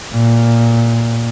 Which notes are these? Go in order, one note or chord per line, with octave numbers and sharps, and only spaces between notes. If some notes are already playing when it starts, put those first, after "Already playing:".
A#2